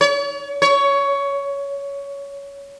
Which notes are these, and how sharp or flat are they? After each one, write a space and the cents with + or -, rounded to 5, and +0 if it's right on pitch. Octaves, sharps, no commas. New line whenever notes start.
C#5 +40
C#5 +15